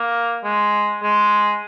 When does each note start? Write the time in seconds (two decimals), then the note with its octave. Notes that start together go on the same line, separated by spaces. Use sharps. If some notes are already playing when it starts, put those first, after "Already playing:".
Already playing: A#3
0.43 G#3
1.02 G#3